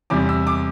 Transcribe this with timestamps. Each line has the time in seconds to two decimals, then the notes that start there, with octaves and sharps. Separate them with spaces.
0.10 E2 C3 G3 D6
0.29 E6
0.47 D6